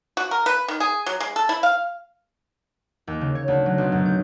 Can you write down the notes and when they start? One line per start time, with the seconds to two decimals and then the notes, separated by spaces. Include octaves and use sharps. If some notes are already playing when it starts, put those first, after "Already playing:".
0.17 F#4
0.31 A#4
0.46 B4
0.68 D#3
0.80 G#4
1.06 F#3
1.20 G#3
1.36 A4
1.49 E4
1.63 F5
3.07 D#2
3.21 C#3
3.35 C#5
3.48 D2
3.66 F#3
3.78 B1
3.92 F#2
4.05 G6